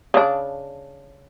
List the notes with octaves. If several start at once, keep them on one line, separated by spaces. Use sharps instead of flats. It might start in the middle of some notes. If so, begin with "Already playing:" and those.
C#3 D4